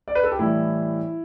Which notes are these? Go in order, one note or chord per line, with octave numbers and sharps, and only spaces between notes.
D5
B4
A4
G4
A2 E3 G3 E4